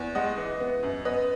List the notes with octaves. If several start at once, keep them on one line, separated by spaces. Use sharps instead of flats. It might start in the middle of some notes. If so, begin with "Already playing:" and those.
Already playing: E2
G#3 D#5 F#5
E3
B3
F#2
B3 B4 D#5